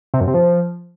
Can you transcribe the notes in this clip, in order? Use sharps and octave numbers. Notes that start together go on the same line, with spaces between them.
C3
F#2
C3
F3